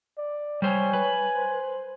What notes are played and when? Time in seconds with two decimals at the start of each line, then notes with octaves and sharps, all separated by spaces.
0.18 D5
0.62 G3 C5 C#5 G#5
0.93 B4
1.36 C5